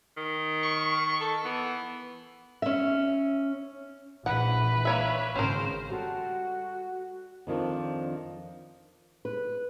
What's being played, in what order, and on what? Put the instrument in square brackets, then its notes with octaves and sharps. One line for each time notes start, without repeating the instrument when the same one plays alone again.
[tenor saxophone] D#3
[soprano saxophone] C#6
A4
[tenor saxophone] E3 [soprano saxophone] B3
[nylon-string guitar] C#4 E5
[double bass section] A#1 E3 [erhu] B4 [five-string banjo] F#5
[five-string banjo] A#3 C#5 E5
[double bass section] G#1 C#3 [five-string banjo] C#4 A#4 [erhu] C5
[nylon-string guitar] G3 A4 [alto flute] F#4
[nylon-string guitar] F2 D#3 F3 [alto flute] D4
[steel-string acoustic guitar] B4